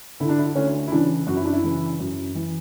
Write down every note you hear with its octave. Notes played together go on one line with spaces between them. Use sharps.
D3 E4
D4
E4
D2 C#4
E4
C#3 E3 D4
F#2 F#4
E4
D4
E4
C#3 E3
F#2
E3